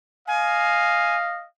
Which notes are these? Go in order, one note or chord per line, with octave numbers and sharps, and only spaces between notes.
D#5 F5 G#5